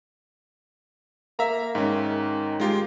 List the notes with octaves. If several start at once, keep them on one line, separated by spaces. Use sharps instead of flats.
A#3 E5 A#5
G#2 D#3 C#4
G#3 F4 G4